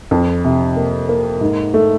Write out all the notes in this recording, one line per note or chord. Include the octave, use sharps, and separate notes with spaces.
F2
C3
A#3
A#3
G#2
A3